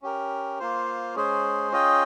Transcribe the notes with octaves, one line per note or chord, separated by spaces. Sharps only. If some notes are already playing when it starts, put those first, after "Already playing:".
C#4 G4 A#4
A#3 F4 C5
G#3 C#4 G#4 C5
C#4 F4 G#4 D#5 G5